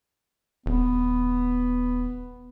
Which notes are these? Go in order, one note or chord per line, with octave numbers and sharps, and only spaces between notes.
D#1 B3